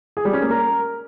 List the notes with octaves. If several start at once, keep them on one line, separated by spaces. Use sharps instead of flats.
G#4
G3
C#4
A#3
A#4